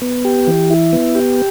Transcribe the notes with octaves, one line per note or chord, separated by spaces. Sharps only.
B3
G4
E3
E4
B3
G4